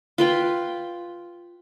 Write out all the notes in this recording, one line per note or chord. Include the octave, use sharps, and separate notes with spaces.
F4 B4 G5